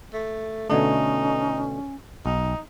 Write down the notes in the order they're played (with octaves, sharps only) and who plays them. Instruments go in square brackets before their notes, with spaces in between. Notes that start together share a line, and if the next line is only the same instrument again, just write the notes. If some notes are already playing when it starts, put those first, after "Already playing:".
[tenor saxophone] A3
[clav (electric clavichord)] B2 D3 A3 [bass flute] C#4 [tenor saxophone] D#4
[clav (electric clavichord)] B1 [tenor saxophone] D#4